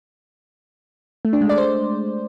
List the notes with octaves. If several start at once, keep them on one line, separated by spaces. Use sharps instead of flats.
A3
D4
G#3
D5
C5